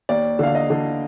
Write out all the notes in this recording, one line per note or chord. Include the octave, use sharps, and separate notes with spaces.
D#2 D5
D3 F5
D#5
D3